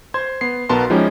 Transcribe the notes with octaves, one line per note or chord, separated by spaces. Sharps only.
C5 C6 G#6
B3 C7
B1 B3 F#4 A#4 A5 C6
F3 G#3 C#4 D#4 E4 G4